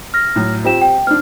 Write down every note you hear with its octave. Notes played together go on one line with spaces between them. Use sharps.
F6 A#6
A2 F#3
C4 F4 G4 E7
G5
C4 D4 F6